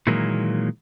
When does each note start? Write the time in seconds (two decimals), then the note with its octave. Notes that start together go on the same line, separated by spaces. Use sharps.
0.07 A#2 D#3 E3 F#3 G#3 A#3